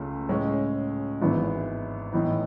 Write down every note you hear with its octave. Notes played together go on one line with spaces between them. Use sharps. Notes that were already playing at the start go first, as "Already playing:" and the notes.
Already playing: C#2 C#3 A3
A2 G#3 C#4
G#1 G#2 E3 B3 E4
A2 E3 B3 D#4